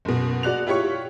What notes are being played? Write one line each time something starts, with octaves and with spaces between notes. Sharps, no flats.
F#1 B2
F#4 D5 F#6 F7
E4 F4 G4 C#5 C#6 C#7